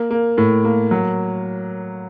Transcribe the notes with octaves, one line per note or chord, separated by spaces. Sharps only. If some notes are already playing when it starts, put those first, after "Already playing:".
Already playing: A#3
A#3
A2
A#3
F#3